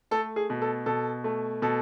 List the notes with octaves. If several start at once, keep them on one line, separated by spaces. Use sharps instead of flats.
A3 A4
G#4
B2
A4
B2 A4
A3
B2 A4